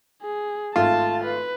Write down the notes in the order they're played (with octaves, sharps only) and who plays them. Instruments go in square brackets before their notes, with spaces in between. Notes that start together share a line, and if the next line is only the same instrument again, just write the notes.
[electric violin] G#4
[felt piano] G#1 A3 [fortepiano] F4 [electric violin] A5
[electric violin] B4